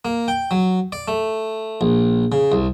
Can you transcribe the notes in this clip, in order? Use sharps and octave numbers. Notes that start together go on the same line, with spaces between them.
A#3
G5
F#3
D5
A3
A#1
C#3
C2